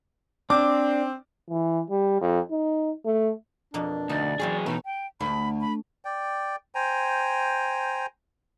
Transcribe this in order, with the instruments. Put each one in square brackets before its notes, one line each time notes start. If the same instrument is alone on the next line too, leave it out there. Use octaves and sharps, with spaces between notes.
[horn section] C4 [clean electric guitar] D4 [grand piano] D6
[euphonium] E3
G3
F2
D#4
A3
[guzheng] F2 B2 A#3 [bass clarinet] D4
[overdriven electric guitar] D2 [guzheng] D#4 [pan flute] D5
[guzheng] E3 C4 C#4 [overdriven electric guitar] F#3 G#4
[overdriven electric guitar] B2 [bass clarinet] E3 [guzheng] A3 [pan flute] D#4
[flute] G5
[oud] D2 [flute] B5
[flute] B5
[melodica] D5 G5
C5 G5 G#5 A#5